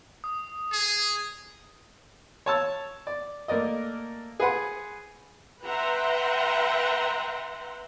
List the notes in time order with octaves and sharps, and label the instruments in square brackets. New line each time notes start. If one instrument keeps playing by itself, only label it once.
[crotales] D#6
[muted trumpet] G#4
[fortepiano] C#5 A5 E6
D5
A3 A#3 A#4 D5 D#5
G#4 B4 C5 F#5 G#5
[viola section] B4 E5 F#5 G5 A#5 C6